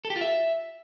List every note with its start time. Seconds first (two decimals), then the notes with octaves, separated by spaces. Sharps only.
0.05 A4
0.10 G4
0.16 F4
0.21 E5